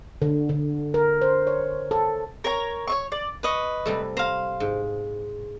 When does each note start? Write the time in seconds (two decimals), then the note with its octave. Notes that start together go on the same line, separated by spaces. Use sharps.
0.22 D3
0.49 D3
0.94 A#4
1.22 C5
1.47 C#5
1.91 A4
2.44 A#4 C#5 A#5
2.88 C#5 E5 C#6
3.12 D5
3.43 B4 D#5 C#6
3.86 C3 G3 A3
4.17 C5 F5 A#5
4.60 G#2